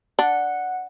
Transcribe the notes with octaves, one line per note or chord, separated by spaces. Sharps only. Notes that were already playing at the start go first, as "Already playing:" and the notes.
D4 F#5